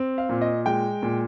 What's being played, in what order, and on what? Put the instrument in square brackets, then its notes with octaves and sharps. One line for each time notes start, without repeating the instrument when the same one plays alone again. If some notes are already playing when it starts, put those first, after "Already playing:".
Already playing: [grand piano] C4
F5
A#2
D#5
G#3 G5
A#2